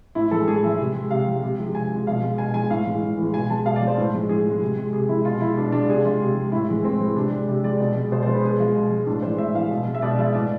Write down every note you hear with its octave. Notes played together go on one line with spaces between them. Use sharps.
A2 E4
E3 G#3 A4
A2 G#4
E3 G#3 E5
C3
G#3
C3 F5
G#3
C3
F3 G#3
C3 G#5
F3 G#3
B2 F5
G#3
B2 G#5
G#3 G#5
A2 F5
E3 G#3
A2
E3 G#3
B2 G#5
G#3 A5
B2 F5
D5
G#3
C5
A2
F3 G#3
A2 G#4
F3 G#3
C3
G#3
C3 G#4
G#3 E4
B2 F4
G#3 E4
B2 D4
G#3 D4
C3 G#4
G#3 F4
C3
G#3
A2 E4
E3 G#3
A2 C4
E3 G#3
C3 D4
G#3
C3
G#3 D5
B2
G#3
B2 C5
G#3 C5
B4
B2 G#4
G#3 F4
B2
G#3
A2 D4
E3 G#3 C5
A2 E5
E3 G#3 F5
B2
G#3
E5
B2 D5
G#3 E5
A2 D5